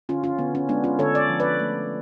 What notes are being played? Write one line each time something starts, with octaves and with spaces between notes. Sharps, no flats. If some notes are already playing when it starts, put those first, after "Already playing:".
D3 C#4 F4
C#4 F4
D3 B3
C#4
G#3 B3 D4
C#4 F4
D3 A4 C#5
D5
F3
B4 D5
A3